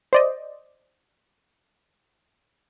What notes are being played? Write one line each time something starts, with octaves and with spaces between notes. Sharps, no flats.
C5 D5 D#5